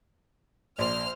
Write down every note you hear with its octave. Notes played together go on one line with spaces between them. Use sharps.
A#1 C5 D5 C6 F6